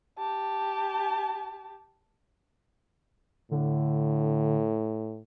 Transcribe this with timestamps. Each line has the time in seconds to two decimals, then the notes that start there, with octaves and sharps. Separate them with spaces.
0.18 G4 A5
3.51 A2 D3